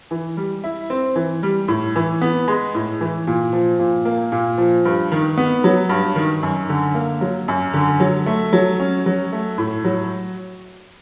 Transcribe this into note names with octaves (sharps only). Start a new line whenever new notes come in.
E3
G3
E4
C4
E3
G3
A2
E3
B3
G#3
A2
E3
A#2
F3
A#2
A#3
A#2
F3
G2
D#3
B3
F#3
G2
D#3
F#2
D3
A#3
F#3
F#2
D3
F#3
A3
F#3
C#4
F#3
A3
A2
F#3